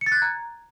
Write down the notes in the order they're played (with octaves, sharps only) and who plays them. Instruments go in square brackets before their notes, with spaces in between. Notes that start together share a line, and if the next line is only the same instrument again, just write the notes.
[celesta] C#7
A6
F#6
G#6
A#5